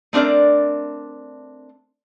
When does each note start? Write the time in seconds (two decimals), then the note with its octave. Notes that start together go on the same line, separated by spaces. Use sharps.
0.13 A3 C4 D4 A#4 D5